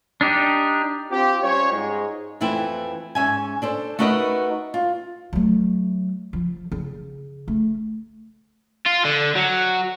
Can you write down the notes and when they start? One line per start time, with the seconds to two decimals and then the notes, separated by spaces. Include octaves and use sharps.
0.21 D4 D#4 G4
1.10 C4 F4 G4
1.42 G3 C#4 F4 C5 C#5
1.72 G#2 G#3
2.41 F2 E3 A3 C4 E4
3.15 G#2 C#4 E5 G#5
3.62 D4 A4 C5
3.99 A3 D#4 F#4 A#4 B4 D#5
4.74 F4
5.33 F#3 A3
6.33 F3
6.72 C#3
7.48 A3
8.86 F4
9.05 D3
9.35 F#3